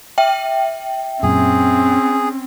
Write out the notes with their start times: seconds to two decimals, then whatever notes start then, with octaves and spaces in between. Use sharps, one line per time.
0.18 E5 G5
1.23 F#2 A#2 C4 C#4 G#4